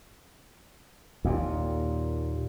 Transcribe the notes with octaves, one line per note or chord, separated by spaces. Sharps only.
D#2 A#2